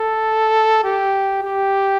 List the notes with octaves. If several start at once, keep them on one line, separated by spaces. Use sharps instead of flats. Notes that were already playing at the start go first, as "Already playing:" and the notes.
Already playing: A4
G4
G4